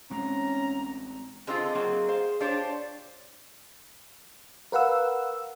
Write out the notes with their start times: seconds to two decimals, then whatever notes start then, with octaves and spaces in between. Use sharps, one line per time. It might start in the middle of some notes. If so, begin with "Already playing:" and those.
0.11 A1 G#3 C4 C#4 A#5
1.47 D3 G#3 C4 F4 G#4
1.75 F#3 A#3 C4
2.09 C5 F5
2.41 D4 F4 G4 C5 C#5
4.72 A#4 B4 F5 F#5 E6